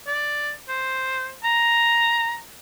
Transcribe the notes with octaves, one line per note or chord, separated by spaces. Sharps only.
D5
C5
A#5